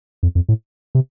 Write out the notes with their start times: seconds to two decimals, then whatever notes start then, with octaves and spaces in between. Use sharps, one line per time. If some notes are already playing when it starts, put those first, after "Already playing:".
0.23 F2
0.35 F2
0.49 A2
0.95 C3